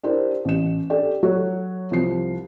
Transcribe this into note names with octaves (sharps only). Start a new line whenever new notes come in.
D4 E4 G4 A#4 C5
A1 E7
D4 G4 A4 D5 G5
F#3 F#4 A4 C#5
C2 F3 C7